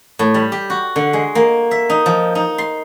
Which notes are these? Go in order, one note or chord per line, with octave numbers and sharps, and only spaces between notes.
A2
G3
G4
F#4
D3
G#3
A#3
E5
D#4
F3
D#4
C6